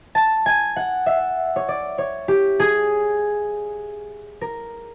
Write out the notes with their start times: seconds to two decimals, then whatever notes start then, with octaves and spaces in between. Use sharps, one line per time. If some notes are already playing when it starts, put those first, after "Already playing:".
0.15 A5
0.46 G#5
0.76 F#5
1.06 E5
1.56 C#5
1.68 D5
1.98 C#5
2.28 G4
2.60 G#4
4.41 A#4